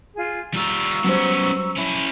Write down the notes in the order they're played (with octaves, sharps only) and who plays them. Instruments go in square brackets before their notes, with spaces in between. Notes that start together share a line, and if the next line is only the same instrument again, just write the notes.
[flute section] F4 G#4
[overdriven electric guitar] G3 F4 [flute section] A#5 C#6 E6
[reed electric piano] F#3 G3 C5 [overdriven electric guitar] B3 C#4
[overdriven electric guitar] C#4 E4